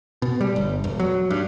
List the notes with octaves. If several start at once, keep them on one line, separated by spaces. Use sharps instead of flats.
B2
G3
G1
E1
F#3
G2